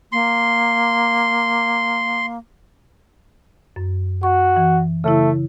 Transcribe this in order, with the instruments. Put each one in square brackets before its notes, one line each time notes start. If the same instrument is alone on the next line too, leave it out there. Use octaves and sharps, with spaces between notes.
[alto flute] A#3 [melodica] C6
[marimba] F#2
[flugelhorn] F#4 [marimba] C#6
[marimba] E3
[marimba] C#3 E4 [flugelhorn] A3